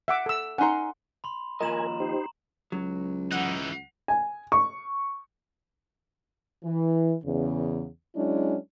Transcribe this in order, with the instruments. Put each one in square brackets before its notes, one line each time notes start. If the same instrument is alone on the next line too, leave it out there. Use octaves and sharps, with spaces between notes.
[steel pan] E5 F#5 D6
A4 E6
[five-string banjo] C#4 D#4 A#5 [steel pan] F#5 C6
[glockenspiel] B5 C6
[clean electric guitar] D#2 F3 D#5 [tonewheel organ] A#4 G#5 [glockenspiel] A#5 E7 F#7
[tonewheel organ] D#4 G4 C5
[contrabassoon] C#2 [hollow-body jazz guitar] F#3
[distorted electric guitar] E3 D#4 [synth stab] F#5
[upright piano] G#5
C#6
[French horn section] E3
E2 C#3
F#3 G#3 C#4 D4 E4